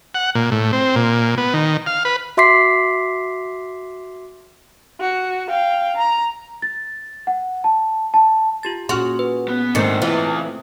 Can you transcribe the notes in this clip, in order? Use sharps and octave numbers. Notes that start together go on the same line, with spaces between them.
F#5
A#2
A2
C4
A#2
B3
D#3
F5
B4
F#4 E5 C6 D6 B6 C7
F#4
F5 G5
A#5
A6
F#5
A5
A5
F4 G4 A6
A#2 C#4 F#4 G#4 C6 F6
B4
B3
G#2 D#3 A3 A#3 C4 D4 C5 C#7
C#3 E3 F4